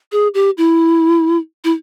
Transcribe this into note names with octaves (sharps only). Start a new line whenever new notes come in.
G#4
G4
E4
E4